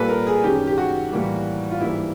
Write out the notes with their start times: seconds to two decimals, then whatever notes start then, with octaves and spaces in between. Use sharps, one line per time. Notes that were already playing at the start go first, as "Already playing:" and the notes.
Already playing: A#2 G3 A#3 A4 B4
0.09 A#4
0.27 G#4
0.44 F#2 D#3 G#3 G4
0.67 G4
0.78 F#4
1.12 A2 E3 G3 A#3
1.71 F4
1.81 G#2 E3 G3 A#3 E4